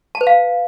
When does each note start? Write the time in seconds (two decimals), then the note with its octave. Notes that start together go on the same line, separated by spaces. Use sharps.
0.15 A5
0.21 B4
0.27 F5